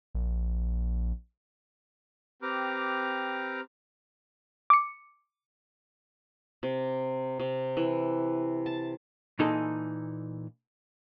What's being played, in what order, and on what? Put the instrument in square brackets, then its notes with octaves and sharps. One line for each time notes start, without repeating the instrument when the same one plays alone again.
[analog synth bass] A#1
[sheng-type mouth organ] C4 G4 B4 A#5 D6 F6
[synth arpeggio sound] D6 C#7
[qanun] C3
C3
E3
A5
[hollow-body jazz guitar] A#2 E3 D#4 G#4 A4